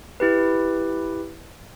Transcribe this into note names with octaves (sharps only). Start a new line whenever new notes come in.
E4 G4 B4